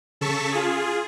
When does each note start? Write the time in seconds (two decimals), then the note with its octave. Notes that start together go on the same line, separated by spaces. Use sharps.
0.21 C#3 A4 A5 C#6 B6
0.52 F4 G#4